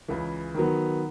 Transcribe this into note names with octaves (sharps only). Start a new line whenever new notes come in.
C#2 C#3 E3
D#3 F#3 B3